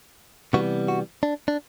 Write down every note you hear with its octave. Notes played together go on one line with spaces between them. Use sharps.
C3 E3 G3 B3 F#4
F#4
D4
D4